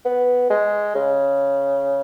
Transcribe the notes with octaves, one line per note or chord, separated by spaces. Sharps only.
B3
G#3
C#3